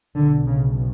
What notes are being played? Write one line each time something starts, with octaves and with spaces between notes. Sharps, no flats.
B1 B2 D3
C#3